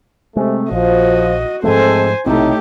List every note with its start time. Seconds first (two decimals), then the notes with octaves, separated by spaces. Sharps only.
0.36 C3 G#3 A3
0.71 A#1 F3 F#4 D#5
1.64 G#2 F3 G#3 A3 C4 A4 C5 G#5
2.26 B1 A2 C3 A3 C4 D#4 G4